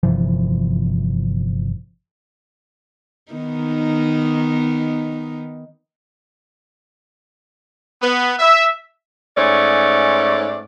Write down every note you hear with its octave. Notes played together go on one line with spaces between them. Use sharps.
G1 C3 E3 F3
D#3 B3 D#4
B3
E5
G#2 A3 C#4 C#5 D5